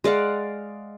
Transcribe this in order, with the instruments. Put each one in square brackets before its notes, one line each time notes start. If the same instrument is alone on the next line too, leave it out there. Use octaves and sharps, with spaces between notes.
[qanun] G#3 D5 F5 F#5